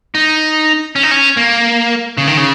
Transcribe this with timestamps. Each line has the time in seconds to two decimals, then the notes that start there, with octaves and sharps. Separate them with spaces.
0.15 D#4
0.96 C#4
1.03 D#4
1.11 C#4
1.37 A#3
2.17 C#3
2.27 D#3
2.37 C#3